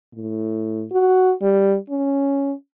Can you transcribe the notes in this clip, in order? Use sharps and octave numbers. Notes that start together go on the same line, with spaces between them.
A2
F#4
G3
C#4